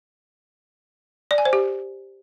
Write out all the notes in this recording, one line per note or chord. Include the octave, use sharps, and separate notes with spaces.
D5
G#5
C5
G4